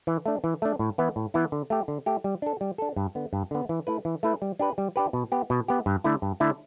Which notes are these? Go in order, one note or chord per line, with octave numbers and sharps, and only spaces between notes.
E3
A3 D4
E3
A3 D4
A2
E3 B3 E4
A2
E3 B3 E4
D3
A3 G4
D3
A3 G4
G3
D4 A4
G3
D4 A4
G2
D3 B3
G2
D3 B3
E3
A3 E4 B4
E3
A3 E4 B4
G3
D4 G4 B4
G3
D4 G4 B4
B2
B3 G4
B2
B3 G4
G2
D3 A3 E4
G2
D3 A3 E4